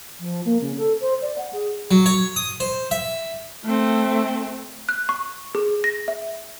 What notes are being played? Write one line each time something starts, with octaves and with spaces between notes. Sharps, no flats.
F3
A#3
C#3
A4
C5
D5
F#5
G#4
F#3
C#5
D#6
C5
E5
A3 C4
F#6
C#6
G#4
A#6
E5